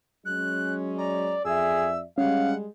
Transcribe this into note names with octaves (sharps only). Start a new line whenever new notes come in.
F#3 G#3 C#4 F#6
D5 A#5
F2 G#4 D5 E5 E6
G3 G#3 C#4 F5 F#5